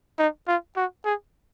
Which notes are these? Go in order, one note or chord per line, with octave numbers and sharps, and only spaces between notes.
D#4
F4
F#4
G#4